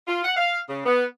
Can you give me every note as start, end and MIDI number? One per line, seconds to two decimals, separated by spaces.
0.07 0.22 65
0.24 0.32 78
0.37 0.59 77
0.68 0.81 49
0.86 1.04 59